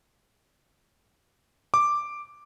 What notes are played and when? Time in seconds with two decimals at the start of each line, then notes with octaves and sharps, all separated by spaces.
1.74 D6